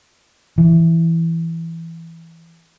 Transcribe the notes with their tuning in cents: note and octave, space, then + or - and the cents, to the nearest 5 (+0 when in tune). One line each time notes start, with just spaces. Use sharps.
E3 +5